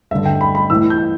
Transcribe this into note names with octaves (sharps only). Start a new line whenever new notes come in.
G2 D3 E5
G5
B5
B5
A2 E3 E6
G6